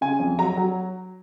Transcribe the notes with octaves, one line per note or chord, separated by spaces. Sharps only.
C#3 G#5
F2
F#3 A#5
F#3